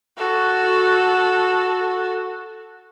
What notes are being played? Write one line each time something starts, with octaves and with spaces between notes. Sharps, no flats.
F#4 A4